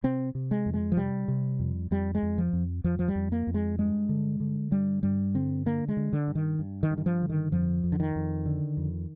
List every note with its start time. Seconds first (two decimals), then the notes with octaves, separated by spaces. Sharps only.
0.04 C3 C4
0.35 C3
0.51 G#3
0.66 F2
0.74 G#3
0.92 F3
0.97 C3 G3
1.28 C3
1.59 F2
1.91 F2 G3
2.15 G#3
2.23 F2
2.38 F3
2.53 F2
2.84 F2 F3
2.99 F3
3.08 G3
3.15 F2
3.32 A#3
3.47 F2
3.54 G#3
3.79 G2 G#3
4.09 D3
4.40 D3
4.71 G2 G3
5.03 G2 G3
5.34 D3 C4
5.66 D3 A#3
5.88 G#3
5.97 D3
6.13 D3
6.28 G2
6.35 D#3
6.59 G2
6.83 D#3
6.91 G2
6.98 D#3
7.06 F3
7.22 D3
7.29 D#3
7.52 F2 F3
7.84 F2
7.92 D3
8.00 D#3
8.16 F2
8.46 D3
8.77 F2